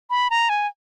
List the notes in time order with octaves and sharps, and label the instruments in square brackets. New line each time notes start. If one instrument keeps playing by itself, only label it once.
[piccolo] B5
A#5
G#5